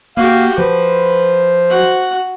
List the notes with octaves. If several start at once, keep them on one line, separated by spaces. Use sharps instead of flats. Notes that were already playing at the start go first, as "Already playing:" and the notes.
A#3 F#4 G4 F5
F3 B4 C5
F#4 F#5